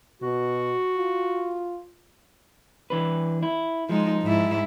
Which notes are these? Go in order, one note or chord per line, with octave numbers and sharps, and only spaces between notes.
B2 F#4
F4
E3 D4 B4
E4
F3 G#3 D#4
G#2 E4